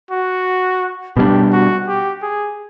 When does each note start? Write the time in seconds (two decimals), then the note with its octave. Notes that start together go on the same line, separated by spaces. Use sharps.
0.11 F#4
1.16 B2 G3 A#3 D4 G4
1.52 F#4
1.88 G4
2.22 G#4